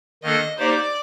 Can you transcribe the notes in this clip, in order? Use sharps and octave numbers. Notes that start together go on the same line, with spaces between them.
D#3 A#3 D4 A4 D#5
A#3 D#4 G4 C5 D5